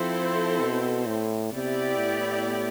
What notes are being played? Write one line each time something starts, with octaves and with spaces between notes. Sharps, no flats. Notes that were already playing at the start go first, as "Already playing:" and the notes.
Already playing: F3 C4 E4 A4 C5
B2
A2
C3 B3 E4 G4 D5
A2